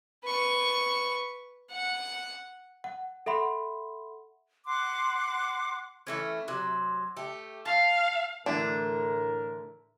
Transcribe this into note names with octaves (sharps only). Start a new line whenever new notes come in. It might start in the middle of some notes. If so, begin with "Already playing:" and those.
B4 C#6
F#5
F#5
A4 E5 F#5 B5 C6
F#5 C6 D6 F#6
E3 A3 C#4
C3 F#3
A3 G4
F5 A5
A2 D3 E3 A3 D4 A#4